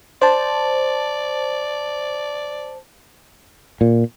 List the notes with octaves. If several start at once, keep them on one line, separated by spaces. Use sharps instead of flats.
C5 D5 A5
A#2